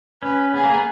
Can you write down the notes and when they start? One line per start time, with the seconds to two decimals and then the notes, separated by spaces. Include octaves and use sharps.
0.23 C#4 B4
0.54 B3 G#4
0.64 A#3
0.73 B3